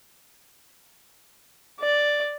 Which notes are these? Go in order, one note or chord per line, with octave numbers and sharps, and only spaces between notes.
D5